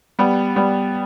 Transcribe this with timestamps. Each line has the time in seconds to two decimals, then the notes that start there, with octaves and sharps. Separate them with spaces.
0.19 G3 B3
0.56 G3 B3